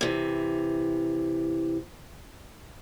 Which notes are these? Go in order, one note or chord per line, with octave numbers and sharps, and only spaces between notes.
C3 E3